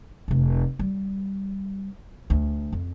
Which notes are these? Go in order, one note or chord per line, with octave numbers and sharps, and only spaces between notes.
F1 C3
G3
D2
F2